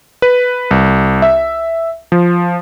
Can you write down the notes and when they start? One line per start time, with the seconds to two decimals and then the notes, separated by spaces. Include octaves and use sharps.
0.22 B4
0.71 C2
1.22 E5
2.12 F3